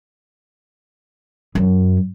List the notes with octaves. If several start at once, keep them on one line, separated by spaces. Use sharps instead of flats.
F#2